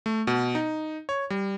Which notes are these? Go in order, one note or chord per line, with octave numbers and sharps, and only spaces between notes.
A3
B2
D#4
C#5
G3